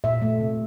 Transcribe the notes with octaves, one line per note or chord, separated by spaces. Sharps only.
A#2 E5
A3
C3